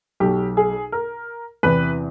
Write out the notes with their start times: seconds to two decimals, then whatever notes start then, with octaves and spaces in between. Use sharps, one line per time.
0.20 B1 B2 F#3 G4
0.57 G#4
0.92 A#4
1.63 E2 C3 E3 B4